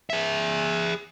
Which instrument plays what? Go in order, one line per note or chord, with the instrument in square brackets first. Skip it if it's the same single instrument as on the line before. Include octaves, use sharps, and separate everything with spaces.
[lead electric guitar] G#4 E5